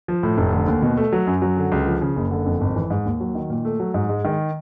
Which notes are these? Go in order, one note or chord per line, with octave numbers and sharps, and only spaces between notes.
F3
A2
F1
D3
D#2
B2
A3
F#3
F#2
F#3
D3
C#2
F3
C#3
F#1
D3
F2
G#1
E3
G#2
D#2
F#3
D#3
A#2
A3
F#3
G#2
G#3
D#3